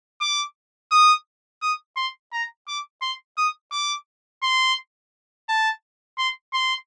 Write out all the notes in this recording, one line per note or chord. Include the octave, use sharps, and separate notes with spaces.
D6
D#6
D#6
C6
A#5
D6
C6
D#6
D6
C6
A5
C6
C6